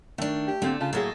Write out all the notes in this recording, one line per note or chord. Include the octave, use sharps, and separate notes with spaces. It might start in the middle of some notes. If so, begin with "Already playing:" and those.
D#3 A3 D4
G4
D3 A3 A#3 C4
C#3 F4 A5
A2 F#3 A#3 G#4 A4 D#5